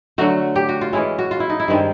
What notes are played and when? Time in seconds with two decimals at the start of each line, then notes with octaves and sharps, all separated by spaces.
0.18 D3 F#3 A3 F#4
0.56 G4
0.69 F#4
0.81 F4
0.93 E3 G#3 C#4 E4
1.19 F#4
1.31 F4
1.40 E4
1.50 D#4
1.60 E4
1.68 G2 D#3 G#3 C4